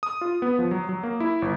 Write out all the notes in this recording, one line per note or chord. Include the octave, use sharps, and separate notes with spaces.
D#6
F4
B3
F3
F#3
F#3
A#3
E4
G1